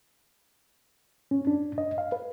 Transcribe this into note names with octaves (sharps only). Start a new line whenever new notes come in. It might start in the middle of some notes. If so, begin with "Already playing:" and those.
C#4
D4
D#5
F5
B4